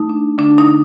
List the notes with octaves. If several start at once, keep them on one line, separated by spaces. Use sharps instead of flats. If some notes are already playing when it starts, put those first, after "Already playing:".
Already playing: A3 D#4
D4
D3 D4
D#4
D3